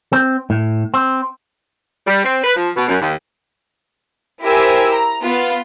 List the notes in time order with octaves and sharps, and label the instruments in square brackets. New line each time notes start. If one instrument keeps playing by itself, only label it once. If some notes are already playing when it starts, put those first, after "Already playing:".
[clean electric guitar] C4
A2
C4
[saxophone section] G3
C4
B4
F3
B2
F#2
D#2
[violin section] E4 G4 A#4 C5 G#5 E6
A#5
B3 F4 F5